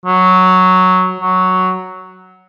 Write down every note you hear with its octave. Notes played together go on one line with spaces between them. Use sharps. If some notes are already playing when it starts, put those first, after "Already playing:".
F#3
F#3